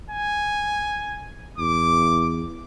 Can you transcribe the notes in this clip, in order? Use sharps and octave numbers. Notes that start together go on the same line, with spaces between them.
G#5
E2 D6